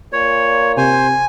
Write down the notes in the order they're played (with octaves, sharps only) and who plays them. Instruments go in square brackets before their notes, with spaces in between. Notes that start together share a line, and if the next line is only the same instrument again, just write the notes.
[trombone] A#2 [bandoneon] C#5
[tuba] C3 [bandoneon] C5 [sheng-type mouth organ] G#5